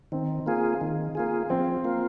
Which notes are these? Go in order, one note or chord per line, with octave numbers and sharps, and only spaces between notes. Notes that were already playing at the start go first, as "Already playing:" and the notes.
D#3 C4
A#3 F4 G#4
D#3
A#3 F4 G#4
F3 C4
A#3 F4